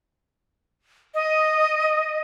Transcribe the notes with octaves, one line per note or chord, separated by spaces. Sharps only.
D#5